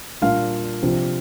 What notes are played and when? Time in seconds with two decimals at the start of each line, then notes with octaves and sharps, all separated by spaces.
0.22 A#2 G3 A#3 D4 F4 F5
0.82 C3 F3 D4 F4